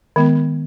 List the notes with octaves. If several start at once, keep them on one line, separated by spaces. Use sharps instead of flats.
D#3 G#3 B3